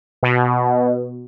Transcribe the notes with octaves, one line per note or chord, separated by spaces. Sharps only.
B2